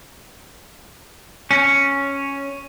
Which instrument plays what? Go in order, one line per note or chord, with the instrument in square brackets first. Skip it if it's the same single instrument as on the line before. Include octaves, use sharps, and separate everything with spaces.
[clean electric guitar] C#4